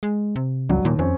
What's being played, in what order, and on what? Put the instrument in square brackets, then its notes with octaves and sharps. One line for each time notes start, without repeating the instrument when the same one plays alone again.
[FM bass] G#3
C3
[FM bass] C#2 [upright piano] G2 F#3
[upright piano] D#2 [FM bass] A#2
[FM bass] F2 [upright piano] C4 C#4